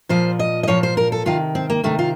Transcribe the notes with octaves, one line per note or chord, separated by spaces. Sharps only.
A#2 F3 C5
D#5
D#5
A#2 F3 C#5
C5
A#4
A4
C3 D#3 F4
C4
A#3
C3 D#3 A3
F4